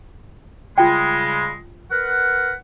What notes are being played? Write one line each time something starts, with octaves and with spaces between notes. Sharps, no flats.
C#3 G3 G#3 F4 G5
A#4 B4 F#5